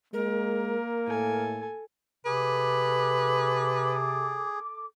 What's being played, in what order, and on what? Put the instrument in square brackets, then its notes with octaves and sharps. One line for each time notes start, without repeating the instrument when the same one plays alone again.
[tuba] G#3 [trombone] A#3 [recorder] A#4
[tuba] A2 [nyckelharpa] A4 G#5
[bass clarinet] C3 [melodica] G#4 [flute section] A4 D6 [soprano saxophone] B4